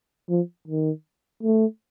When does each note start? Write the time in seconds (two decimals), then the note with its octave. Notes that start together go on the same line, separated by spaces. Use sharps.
0.29 F3
0.68 D#3
1.43 A3